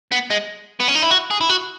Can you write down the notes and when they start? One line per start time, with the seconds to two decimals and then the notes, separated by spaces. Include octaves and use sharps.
0.12 B3
0.30 G#3
0.80 B3
0.88 C#4
0.95 D#4
1.02 E4
1.11 F#4
1.31 G#4
1.41 E4
1.49 F#4